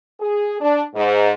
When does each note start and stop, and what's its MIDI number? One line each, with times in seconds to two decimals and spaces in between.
0.20 0.55 68
0.61 0.82 62
0.94 1.31 44